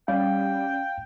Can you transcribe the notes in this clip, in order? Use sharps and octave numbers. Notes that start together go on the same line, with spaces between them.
G3 C#4 D5 F5 G5